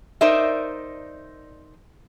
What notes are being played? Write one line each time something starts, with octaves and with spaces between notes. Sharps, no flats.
D#4 A#4 C5 D5 E5